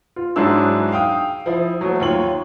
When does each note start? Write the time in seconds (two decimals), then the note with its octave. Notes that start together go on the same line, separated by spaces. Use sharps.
0.16 F4
0.36 G#2 F#3 G#3 D4 E4 E6
0.92 F5 G5 D#6
1.46 F3 E4
1.81 F#3 A3
2.00 D#2 F4 C#5 F#7